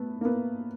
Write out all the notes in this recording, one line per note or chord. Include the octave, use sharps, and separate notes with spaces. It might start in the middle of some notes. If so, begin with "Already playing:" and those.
Already playing: A3 B3
A#3
B3